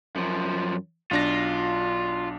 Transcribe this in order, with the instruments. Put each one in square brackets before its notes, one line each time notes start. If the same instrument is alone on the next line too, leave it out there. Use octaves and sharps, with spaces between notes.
[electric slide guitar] F#2 F3
[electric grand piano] B1 D4 A#6 [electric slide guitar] F4